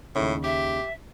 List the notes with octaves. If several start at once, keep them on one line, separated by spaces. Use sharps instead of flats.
D#2 A2 C#3
G4 E5